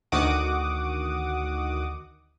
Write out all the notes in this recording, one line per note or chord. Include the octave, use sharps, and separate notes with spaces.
D2 D#3 F#4 F#5 D6 D#6